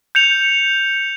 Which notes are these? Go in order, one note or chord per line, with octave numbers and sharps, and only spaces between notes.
G6 C#7 F7